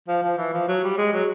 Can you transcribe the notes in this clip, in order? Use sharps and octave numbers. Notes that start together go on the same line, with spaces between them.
F3
F3
E3
F3
F#3
G3
G#3
F#3